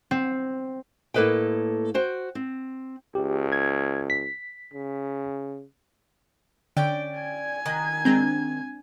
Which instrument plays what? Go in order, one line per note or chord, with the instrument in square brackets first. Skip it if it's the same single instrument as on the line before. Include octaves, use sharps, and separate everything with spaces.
[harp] C4
[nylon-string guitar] A2 A#3 A4 B4 D#5 G5
F#4 C5 G5
C4
[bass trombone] C#2 [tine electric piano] G4
[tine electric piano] G#6
B6
[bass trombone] C#3
[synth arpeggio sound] D3 [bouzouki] C#4 D5 G5
[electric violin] G#5 G#6
[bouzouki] D#3 [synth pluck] D#6 F#6 A#6
[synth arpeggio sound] G#3 A#5 G6 [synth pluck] C4 D4